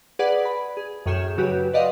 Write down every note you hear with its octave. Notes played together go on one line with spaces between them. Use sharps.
G#4 B4 D5 F#5
B5
G#4
F#2 A2 G#4 C#5 G6 E7
C#3 F#3 F#4 G4 B4
B4 D5 D#5 F5 F#5 C6